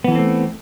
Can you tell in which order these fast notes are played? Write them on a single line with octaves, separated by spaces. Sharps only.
B3 E3 A4 C4 A3